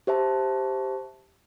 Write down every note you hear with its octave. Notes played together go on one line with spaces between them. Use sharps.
G4 C5 E5 A5